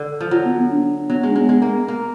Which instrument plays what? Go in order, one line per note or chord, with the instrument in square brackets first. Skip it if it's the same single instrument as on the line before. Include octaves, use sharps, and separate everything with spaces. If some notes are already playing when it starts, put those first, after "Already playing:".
Already playing: [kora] D3
F3
[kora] F#3 [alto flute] F4
[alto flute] B3
B3
D4
[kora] F#3 [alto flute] B3
[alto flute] B3
[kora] G#3
[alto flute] D4
[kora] G#3 [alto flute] B3
[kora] G#3
A#3
A#3